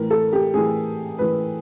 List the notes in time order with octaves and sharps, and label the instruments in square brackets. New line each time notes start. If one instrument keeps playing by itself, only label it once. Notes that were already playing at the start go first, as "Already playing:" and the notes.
Already playing: [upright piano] A2 E3 A#4
A4
G4
A2 E3 G#4
A2 E3 B4